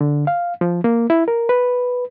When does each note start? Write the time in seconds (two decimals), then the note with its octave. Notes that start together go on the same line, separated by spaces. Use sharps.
0.01 D3
0.27 F5
0.61 F3
0.84 A#3
1.10 E4
1.28 A#4
1.49 B4